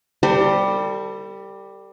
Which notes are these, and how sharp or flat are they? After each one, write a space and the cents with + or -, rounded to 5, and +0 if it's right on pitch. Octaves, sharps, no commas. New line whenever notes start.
G3 +0 A4 +45 C5 +0